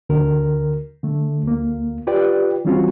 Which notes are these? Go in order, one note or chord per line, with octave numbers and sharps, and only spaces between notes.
D2 D3 A#4
D3 A3
D2 A#3
F4 G4 B4 D5 G5
E3 G3 C4 C#4 F4 F#4